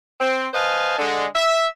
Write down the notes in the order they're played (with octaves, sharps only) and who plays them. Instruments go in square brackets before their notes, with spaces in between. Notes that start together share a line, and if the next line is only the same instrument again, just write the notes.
[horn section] C4
B4 C5 D#5 F5 G#5 A5
D3 G#3
E5